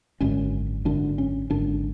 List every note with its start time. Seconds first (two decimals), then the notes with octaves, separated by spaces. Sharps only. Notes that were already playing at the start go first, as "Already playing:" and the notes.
0.20 G#1 F#2 D3 C#4
0.85 G#1 F#2 D3 D4
1.18 C#4
1.50 G#1 F#2 D3 D4